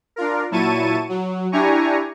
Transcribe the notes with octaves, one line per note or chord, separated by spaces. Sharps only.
D4 F4 A#4
A#2 F#3 E4 A5 C#6 D#7
F#3
D4 E4 G4 G#5 A#5 C#6